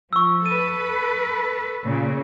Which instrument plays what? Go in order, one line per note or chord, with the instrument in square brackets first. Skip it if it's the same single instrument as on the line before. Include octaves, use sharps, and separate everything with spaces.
[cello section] F3 [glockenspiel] C#6 E6
[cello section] A4 B4 [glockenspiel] D#7
[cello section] A#2 C#3